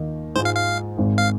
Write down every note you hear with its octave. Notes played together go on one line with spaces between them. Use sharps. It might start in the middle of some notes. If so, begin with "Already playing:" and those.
Already playing: D#2 D#3 A#3 D#4
G#2 G#3 F4 C5
F5
F5
G#1 G#2 G#3
F5